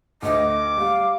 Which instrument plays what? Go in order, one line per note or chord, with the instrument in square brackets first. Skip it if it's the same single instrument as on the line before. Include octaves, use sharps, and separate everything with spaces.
[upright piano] D2 [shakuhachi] D#5 [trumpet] D6
[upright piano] G3 [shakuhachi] F5